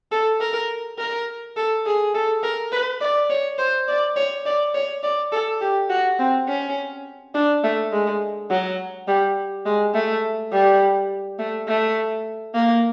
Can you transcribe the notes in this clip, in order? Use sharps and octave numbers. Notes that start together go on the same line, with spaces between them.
A4
A#4
A#4
A4
G#4
A4
A#4
B4
D5
C#5
C5
D5
C#5
D5
C#5
D5
A4
G4
F#4
C4
C#4
D4
A3
G#3
F#3
G3
G#3
A3
G3
A3
A3
A#3